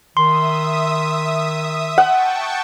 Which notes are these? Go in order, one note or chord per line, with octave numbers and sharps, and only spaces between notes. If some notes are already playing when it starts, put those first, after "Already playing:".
D#3 E5 C6 D#6
F#5 G5 A5 C#6